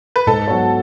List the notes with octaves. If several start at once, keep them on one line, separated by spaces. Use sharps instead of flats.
B4
G#2 A4
F#3 B3 F#4 C#5